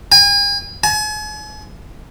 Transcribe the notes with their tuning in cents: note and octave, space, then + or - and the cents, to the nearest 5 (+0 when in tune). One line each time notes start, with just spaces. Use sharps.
G#5 -40
G#5 +40